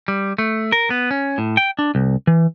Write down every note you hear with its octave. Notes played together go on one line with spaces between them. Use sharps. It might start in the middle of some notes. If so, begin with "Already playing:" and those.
G3
A3
A#4
B3
C#4
A2
G5
D4
C2
E3